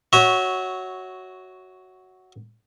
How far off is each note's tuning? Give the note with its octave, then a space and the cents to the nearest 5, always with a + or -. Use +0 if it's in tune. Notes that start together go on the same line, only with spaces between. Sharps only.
F#4 +5 C#5 +0 E5 -25